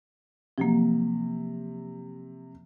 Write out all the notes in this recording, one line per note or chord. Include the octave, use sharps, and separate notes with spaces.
C3 F3 F#3 A#3